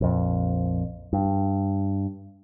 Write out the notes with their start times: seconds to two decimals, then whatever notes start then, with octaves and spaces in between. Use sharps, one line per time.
0.01 A#1 F2
1.13 G2